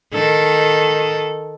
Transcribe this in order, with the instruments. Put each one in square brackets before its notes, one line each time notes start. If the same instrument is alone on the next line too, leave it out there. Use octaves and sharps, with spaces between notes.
[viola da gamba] D#3 A4